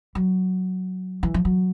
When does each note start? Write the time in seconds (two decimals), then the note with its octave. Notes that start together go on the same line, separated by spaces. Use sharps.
0.15 F#3
1.23 E3
1.34 F3
1.45 F#3